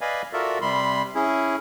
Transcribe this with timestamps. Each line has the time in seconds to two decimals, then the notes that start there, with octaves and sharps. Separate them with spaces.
0.01 B4 D5 D#5 F5 G#5 B5
0.33 F4 F#4 A4 A#4 D5 E5
0.61 C3 G3 B5 C6
1.15 C#4 E4 G#4